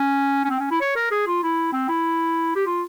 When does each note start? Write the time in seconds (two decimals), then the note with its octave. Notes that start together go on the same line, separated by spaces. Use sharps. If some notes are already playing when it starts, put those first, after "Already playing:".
Already playing: C#4
0.45 C#4
0.50 C4
0.60 C#4
0.71 E4
0.81 C#5
0.96 A#4
1.11 G#4
1.27 F4
1.43 E4
1.73 C4
1.89 E4
2.56 G4
2.66 F4